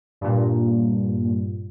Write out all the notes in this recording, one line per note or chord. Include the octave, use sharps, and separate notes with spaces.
G2 A#2